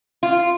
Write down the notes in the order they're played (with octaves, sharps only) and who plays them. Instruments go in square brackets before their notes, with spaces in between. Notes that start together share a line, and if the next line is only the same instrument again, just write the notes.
[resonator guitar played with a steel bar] F4